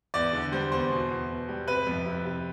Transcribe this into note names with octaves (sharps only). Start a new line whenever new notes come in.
E2 D5
D3
G3 C5
E2 C5
B2
E2
B2
G3
C3 B4
F2
C3
C3